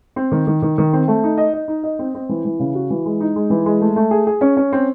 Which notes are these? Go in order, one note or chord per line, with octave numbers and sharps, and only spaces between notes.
C4
D#3
D#3
D#3
D#3
C4
A3
D#4
D#5
D#5
D#4
D#5
C4
C4
E3
E3
C#3
F#4
E3
G#3
D#4
G#3
E3
G#3
A3
A3
G#4
G#4
C#4
C#4
C4